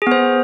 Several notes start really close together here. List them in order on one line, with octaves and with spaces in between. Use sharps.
G#4 B3 C5